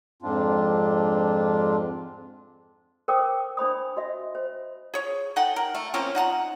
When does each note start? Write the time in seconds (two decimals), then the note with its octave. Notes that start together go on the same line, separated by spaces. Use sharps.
0.22 F2 G#2 C4 D4 F4
3.08 A#4 C5 G5 D6 D#6
3.57 D4 C5 B5 D#6
3.97 F#4 D#5 E5
4.35 C5
4.94 G#4 C#5
5.36 D#4 A4 F#5 G5
5.56 A#4
5.75 A3
5.94 F3 A#3 C4 C#4
6.15 D#4 F#5 A5 A#5